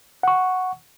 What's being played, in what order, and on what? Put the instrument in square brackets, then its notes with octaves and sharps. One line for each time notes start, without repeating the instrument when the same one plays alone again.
[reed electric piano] F#5 C#6